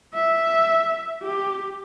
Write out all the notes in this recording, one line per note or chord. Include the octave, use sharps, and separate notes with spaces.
E5
G4